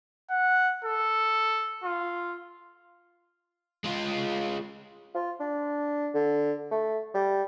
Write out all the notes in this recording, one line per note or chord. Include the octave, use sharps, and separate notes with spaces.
F#5
A4
F4
G#3 F4
F4
D4
D3
A3
G3